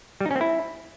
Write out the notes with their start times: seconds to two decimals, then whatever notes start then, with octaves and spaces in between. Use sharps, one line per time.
0.20 G3
0.26 D#4
0.31 C#4
0.36 C4
0.41 E4